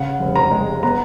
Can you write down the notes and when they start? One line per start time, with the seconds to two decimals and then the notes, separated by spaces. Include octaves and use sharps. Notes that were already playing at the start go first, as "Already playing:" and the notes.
Already playing: C#3 F#5
0.20 F1
0.36 A#5
0.51 G#3
0.83 B3 A#5